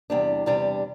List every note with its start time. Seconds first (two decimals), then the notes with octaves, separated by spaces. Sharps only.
0.10 E2 C3 G3 D4
0.46 E2 C3 G3 D4